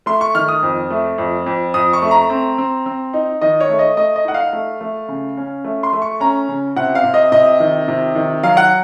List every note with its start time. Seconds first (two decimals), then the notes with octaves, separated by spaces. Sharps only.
0.06 A3 C6
0.21 C#6
0.35 D#3 F6
0.49 D#6
0.63 F2
0.91 A3
1.18 F2
1.46 F2
1.74 F2 D#6
1.93 C#6
2.02 A3
2.11 A#5
2.30 C4
2.58 C4
2.86 C4
3.14 D#4
3.41 D#3 D#5
3.60 C#5
3.69 A3
3.79 D#5
3.97 A3 D#5
4.16 D#5
4.25 D#4 F#5
4.34 F5
4.53 A3
4.81 A3
5.08 C#3
5.37 C#4
5.64 A3
5.83 C6
5.93 A3
6.02 C#6
6.20 C#4 A#5
6.49 C#3
6.76 C3 F#5
6.95 F5
7.04 C3
7.14 D#5
7.32 C3 D#5
7.60 D#3
7.88 C3
8.15 D#3
8.43 F#3 F5
8.57 F#5